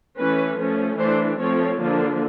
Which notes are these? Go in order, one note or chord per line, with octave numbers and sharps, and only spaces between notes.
E3 A3 C#4 B4
F3 A3 C#4
E3 A3 D4 C5
F3 A3 C4 C#5
D3 F3 A#3 D4